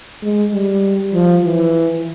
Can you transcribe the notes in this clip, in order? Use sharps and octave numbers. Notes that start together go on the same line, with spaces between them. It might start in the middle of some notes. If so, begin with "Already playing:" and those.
G#3
G3
F3
E3